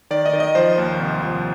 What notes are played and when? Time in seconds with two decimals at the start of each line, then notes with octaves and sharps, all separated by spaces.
0.10 D#3 D5
0.26 D#5
0.33 D#3
0.40 D#5
0.55 F3 C5
0.78 D#2
1.00 C2
1.23 F3